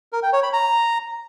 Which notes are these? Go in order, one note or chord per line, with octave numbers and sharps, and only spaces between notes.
A#4
G5
C#5
B5
A#5